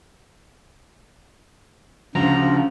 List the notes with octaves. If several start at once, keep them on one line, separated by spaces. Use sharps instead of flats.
D2 C#3 F3 A#5